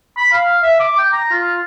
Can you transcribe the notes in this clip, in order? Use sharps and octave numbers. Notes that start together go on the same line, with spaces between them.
B5
F5
E5
D6
G5
A#5
F4